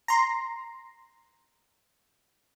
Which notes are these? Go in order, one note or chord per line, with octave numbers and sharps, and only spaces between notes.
A#5 C6